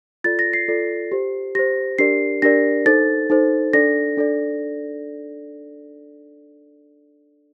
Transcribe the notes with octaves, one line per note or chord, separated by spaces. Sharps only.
F4 A4 D5 A6
A#6
C7
F4 A4 D5
G4 C5
G4 C5 A#6
D4 G4 A#4 D5 C7
D4 G4 A#4 D5 A#6
D#4 A4 C5 A6
D#4 A4 C5
D4 A4 D5 A#6
D4 A4 D5